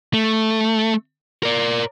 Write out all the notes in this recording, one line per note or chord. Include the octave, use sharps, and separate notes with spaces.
A3
A#4 D5